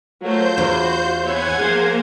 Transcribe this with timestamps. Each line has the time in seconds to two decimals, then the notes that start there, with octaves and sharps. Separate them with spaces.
0.23 F#3 A3 F4 A#4 C5 G6
0.58 E2 F#4
1.23 B3 E4 C#5 F#5 G#5 G#6
1.57 F3 A#3 G#4 C5 F5